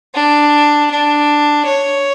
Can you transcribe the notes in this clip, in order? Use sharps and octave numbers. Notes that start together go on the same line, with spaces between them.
D4
D4
C#5